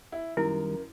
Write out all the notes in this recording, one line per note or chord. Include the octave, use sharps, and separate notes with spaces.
E4
F#2 D#3 G3 E4 A#4